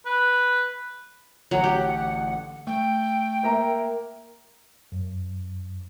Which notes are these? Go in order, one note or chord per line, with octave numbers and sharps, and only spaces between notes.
B4
A1 D3 F#3 F#5
G4
A3 G5
A#3 E5 A#5
F#2